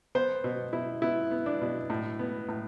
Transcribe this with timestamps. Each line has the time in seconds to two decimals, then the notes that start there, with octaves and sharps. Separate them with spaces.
0.15 B3 C5
0.44 B2
0.73 B2 E4
1.02 B3 E4
1.31 B3
1.46 D4
1.61 B2
1.90 A2
2.19 B3
2.49 A2